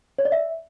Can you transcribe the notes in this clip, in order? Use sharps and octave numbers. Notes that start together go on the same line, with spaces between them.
C#5
D5
E5